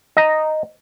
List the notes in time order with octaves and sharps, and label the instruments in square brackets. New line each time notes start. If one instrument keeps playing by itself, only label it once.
[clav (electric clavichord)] D#5 A#5